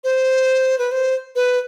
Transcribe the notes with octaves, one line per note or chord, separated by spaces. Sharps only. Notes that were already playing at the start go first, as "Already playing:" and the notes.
C5
B4
C5
B4